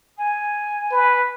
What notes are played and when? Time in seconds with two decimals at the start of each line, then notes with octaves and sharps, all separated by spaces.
0.17 G#5
0.92 B4